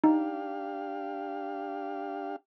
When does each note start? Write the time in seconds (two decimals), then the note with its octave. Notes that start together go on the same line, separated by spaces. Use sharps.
0.04 D4 D#4 G4 F5